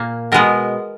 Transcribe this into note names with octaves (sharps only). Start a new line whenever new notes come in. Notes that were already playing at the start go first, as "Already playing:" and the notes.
Already playing: A#2 A#3
B2 G#3 B3 A#4